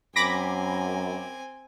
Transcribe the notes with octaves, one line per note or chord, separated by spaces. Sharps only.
F#2 C4 G#5 B5 D6 A#6